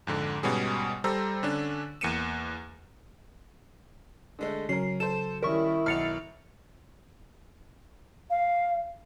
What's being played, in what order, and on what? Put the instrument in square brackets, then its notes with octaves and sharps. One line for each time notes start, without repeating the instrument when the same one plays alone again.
[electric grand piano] F2 G#2 D3
G#2 B2 G3 B3 C#4 G#4
G3 A4 C5 A#5 E6
D3 C#4 D4
E2 A#3 C#7 D#7 E7
[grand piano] D3 G#3 A3
[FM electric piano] C#3 F#3 [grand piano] C#4 A#4 [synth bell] C7
[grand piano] A4 C5 [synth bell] E7
[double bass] D#3 E4 [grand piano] G3 C#4 [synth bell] A#4 C#6
[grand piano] B1 [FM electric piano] F#5 A6 C7 [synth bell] F6 C#7 F7
[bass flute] F5